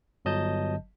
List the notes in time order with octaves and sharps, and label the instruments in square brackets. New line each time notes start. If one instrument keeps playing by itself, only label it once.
[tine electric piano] G1 F#3 D#5 A5 G6